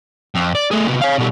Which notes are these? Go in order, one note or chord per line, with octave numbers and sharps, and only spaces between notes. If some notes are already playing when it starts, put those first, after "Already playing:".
F2
D5
A3 G#4
C3 B3
C#5 F5
B2 G3